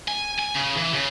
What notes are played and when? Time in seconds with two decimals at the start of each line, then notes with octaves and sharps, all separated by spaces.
0.08 G#5
0.39 G#5
0.55 C#3
0.77 E3
0.94 C#3